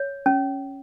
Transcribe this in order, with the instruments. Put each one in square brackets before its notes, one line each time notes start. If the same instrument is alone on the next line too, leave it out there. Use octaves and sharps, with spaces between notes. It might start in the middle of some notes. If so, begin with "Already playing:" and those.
Already playing: [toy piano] C#5
C#4